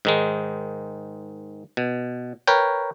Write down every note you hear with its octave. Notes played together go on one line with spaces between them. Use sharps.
G#2 D#3 G#3
B2
A#4 B4 C#5 G5